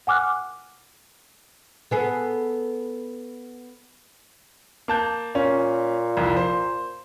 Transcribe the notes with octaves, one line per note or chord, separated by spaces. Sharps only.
F#5 G#5 D6 F6 F#6
B3 G#4 A4
A#3 A5 G6
A#2 C#4
C2 F2
C5